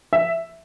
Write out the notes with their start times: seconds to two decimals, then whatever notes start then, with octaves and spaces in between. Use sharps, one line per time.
0.13 E5